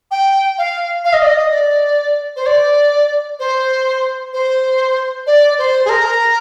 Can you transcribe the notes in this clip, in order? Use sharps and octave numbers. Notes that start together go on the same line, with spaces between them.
G5
F5
F5
D#5
D5
D#5
D5
C5
D5
C5
C5
D5
C5
G#4
A#4